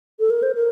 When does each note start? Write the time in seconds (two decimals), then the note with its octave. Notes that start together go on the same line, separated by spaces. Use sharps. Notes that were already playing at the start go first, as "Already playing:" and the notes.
0.20 A4
0.30 A#4
0.43 C5
0.55 A#4